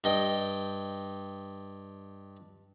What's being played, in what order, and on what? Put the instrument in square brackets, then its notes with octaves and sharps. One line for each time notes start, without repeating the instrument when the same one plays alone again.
[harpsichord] G2 D#5 G5